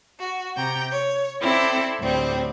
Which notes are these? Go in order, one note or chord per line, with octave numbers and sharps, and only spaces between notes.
F#4
C3 G5 A#5
C#5
C4 E4 A4 D5
D2 A2 G3 C4